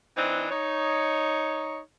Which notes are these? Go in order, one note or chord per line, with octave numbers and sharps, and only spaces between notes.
E3 C4 D4 D#4
D#4 C#5